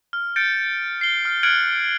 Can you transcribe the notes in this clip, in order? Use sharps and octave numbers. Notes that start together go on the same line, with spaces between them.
F6
G6 A6 C#7 D7
C7 G7
F6
F6 F#6 G#6 C#7 D7 F#7